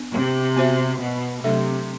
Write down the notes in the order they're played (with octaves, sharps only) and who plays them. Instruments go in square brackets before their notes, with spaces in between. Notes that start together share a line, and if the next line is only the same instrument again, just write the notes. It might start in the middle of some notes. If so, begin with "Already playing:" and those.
Already playing: [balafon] B3 D4
[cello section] C3
[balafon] B3 F#4 C5 E5
[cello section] B2
[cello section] C3 [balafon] F#3 A3 D4 A4 E5